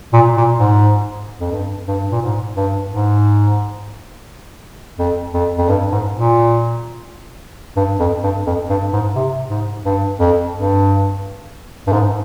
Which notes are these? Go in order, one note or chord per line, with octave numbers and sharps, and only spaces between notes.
A#2
A#2
G#2
F2
G2
G2
A#2
G#2
G2
G#2
F2
F2
F2
G2
G#2
A#2
G2
F2
G2
F2
G2
G#2
C3
G#2
G2
F2
G2
G2
G#2